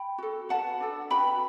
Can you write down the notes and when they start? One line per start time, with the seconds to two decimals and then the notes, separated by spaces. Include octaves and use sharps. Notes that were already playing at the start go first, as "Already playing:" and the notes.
Already playing: G5 B5
0.18 F#4 A4
0.49 F#4 B4 F#5 A5
0.80 D4 A4
1.10 F#4 B4 G5 B5